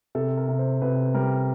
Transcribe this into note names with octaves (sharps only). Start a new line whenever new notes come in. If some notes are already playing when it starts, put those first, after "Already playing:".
C3 A4
A#4
C3
C5
C3 B4
G3 A#4